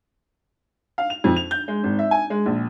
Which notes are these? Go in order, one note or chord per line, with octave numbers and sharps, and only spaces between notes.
F5
F7
F2
F7
G6
G#3
G#1
E5
G#5
G#3
A#1